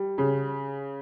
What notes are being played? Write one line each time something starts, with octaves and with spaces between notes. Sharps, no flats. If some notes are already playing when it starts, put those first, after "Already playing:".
Already playing: G3
C#3